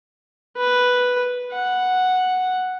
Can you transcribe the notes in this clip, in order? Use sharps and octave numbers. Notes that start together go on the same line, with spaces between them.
B4
F#5